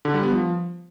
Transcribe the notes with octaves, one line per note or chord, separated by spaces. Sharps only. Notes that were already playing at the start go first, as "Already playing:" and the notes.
D3
G3
B3
F3